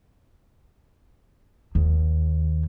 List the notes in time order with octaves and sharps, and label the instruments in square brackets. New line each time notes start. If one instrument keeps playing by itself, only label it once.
[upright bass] D#2